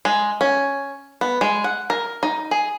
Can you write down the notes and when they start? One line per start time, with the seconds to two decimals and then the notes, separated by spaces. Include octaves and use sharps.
0.05 G#3
0.41 C#4
1.21 B3
1.41 G#3
1.64 F#5
1.90 A#4
2.23 D#4
2.51 G#4